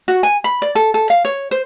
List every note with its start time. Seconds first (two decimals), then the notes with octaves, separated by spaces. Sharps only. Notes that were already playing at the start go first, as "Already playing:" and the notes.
0.08 F#4
0.23 G#5
0.44 B5
0.62 D5
0.75 A4
0.94 A4
1.10 F5
1.25 C#5
1.51 C5